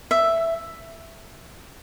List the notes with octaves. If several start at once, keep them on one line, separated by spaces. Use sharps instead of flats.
E5